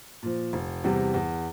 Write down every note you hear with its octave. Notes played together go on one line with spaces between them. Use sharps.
A#2 F3
F1
E2 C3 G3
E2